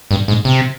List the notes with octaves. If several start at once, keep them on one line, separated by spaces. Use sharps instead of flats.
G2
G#2
C3